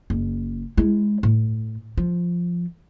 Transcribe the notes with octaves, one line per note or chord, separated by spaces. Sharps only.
F#1
G#3 E4
A2
F3